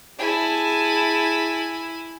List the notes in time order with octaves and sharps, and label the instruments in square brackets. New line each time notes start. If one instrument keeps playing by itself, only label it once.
[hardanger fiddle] E4 G#5 [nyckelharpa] G#4 A5